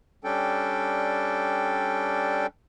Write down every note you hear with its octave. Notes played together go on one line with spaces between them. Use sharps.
G3 C#4 D4 A4 G5